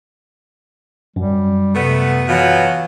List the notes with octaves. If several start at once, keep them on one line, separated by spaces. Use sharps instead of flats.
F#2 G3
C3 A3 B3
B2 E3 F#3 F4